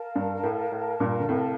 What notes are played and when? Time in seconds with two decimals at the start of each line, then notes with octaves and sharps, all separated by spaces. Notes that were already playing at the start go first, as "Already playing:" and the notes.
Already playing: A#4 F5 A5
0.15 G2
0.43 A2
0.72 A2
1.00 G2 A#2
1.20 D3
1.29 A2 C3